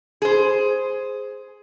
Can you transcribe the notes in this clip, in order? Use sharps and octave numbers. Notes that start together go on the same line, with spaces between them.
G#4 C5